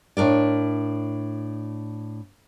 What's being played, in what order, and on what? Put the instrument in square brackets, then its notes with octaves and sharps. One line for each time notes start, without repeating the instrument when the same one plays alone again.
[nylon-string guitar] A2 D4 A#4 D5